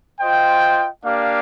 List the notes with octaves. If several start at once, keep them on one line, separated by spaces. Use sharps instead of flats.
F4 C5 D#5 G5
A#3 D4 G4 D5 F5